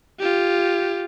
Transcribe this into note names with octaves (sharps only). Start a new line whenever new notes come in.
F4 G4